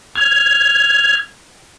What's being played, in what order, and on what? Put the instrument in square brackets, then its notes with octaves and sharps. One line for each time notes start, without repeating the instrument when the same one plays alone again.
[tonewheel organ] F6 G#6